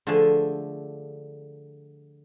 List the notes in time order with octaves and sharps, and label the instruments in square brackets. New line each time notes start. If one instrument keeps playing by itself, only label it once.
[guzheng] D3 F3 A3 D4 G#4